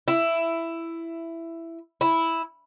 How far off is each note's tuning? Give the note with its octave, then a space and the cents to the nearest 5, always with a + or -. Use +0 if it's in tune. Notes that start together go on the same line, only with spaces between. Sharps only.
E4 +10
E4 -5